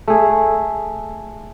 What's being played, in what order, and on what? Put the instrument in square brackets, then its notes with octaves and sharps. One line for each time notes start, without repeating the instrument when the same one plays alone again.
[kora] A3 G#4